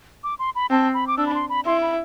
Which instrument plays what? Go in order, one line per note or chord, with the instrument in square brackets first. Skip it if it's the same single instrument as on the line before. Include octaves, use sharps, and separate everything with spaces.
[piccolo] D6
C6
B5
[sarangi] C4 [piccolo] A5
[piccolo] B5
D6
[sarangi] D4 [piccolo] E6
[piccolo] B5
C6
B5
[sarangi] E4 [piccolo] C6
[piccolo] B5